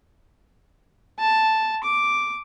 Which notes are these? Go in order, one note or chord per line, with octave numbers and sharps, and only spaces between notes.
A5
D6